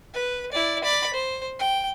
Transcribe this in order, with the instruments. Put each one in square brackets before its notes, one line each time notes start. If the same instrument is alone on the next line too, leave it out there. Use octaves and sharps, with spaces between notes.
[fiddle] B4
E4 D5
D5 B5
C5
G5